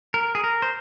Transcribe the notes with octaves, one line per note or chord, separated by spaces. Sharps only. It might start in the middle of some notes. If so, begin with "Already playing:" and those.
A#4
G#4
A#4
C5